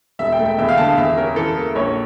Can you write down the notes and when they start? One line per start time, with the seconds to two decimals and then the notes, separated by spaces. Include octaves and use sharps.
0.19 E1 E5
0.32 G5
0.39 A3
0.46 G5
0.58 E2 E5
0.69 F5
0.77 D3 A5
0.88 F5
0.97 E2 E5
1.17 C#4 A#4
1.36 E3 A4
1.56 A#3 A#4
1.75 A#1 C#5